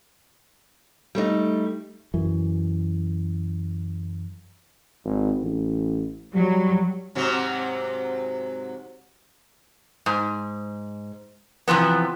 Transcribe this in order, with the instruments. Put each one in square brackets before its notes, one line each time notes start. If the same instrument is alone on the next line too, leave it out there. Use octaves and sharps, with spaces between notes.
[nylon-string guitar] G3 A3 C4 D#4
[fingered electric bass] F#2 E3
[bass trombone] G#1
A1
[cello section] F#3 [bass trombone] G3
[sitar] G#2 C3 F#3
[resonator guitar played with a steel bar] G#2
C3 E3 F3 B3